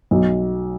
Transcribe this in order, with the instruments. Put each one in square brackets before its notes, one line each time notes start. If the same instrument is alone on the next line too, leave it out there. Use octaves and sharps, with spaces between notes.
[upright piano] B1